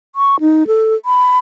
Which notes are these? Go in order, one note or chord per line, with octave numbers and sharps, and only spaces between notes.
C#6
D#4
A4
B5